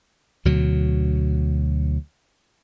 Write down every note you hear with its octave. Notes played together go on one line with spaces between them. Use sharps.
D2 B2 F#3